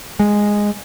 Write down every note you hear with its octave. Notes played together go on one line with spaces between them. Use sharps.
G#3